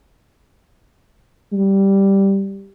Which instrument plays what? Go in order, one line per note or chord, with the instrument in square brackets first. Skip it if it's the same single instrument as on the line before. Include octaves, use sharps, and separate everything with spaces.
[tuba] G3